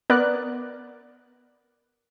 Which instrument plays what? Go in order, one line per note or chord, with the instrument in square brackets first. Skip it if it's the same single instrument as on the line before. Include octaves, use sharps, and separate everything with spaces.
[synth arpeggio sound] B3 A#4 D5 F#6